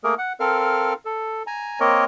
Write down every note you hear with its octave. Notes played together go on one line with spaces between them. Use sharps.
A3 A#3 G#4 A#4
F#5
C4 A4 A#4 F5 F6
A4
G#5 A#5
A#3 C4 A#4 C#5 D#5